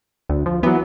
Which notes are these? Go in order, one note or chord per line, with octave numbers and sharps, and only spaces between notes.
D2
F3
E3 F#3 B3